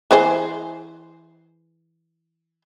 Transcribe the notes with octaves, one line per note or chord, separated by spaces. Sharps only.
E3 G#4 C5